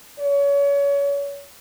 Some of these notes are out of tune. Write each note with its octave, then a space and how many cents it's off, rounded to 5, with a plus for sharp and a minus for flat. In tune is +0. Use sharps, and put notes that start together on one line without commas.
C#5 +30